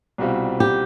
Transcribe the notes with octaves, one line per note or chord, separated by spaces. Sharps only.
C2 B2 G3 C4 F4
G4